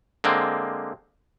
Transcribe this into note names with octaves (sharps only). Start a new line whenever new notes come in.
D3 G#3 A#3 C4